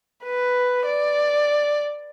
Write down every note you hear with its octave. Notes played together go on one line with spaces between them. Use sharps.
B4
D5